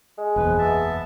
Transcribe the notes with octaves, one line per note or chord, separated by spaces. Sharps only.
G#3
F#1 E2 B2 F3 B4
B3 E5 A5